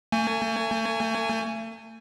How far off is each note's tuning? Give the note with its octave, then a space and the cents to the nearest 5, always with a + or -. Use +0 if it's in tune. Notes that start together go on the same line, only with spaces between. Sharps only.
A3 +40 G#5 +0